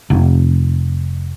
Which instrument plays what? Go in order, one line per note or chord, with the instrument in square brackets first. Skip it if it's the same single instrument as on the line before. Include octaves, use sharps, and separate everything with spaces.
[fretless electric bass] F1